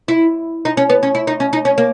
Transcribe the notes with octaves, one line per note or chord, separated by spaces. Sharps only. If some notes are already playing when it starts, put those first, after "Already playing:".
E4
D#4
C#4
B3
C#4
E4
D#4
C#4
D#4
C#4
A#3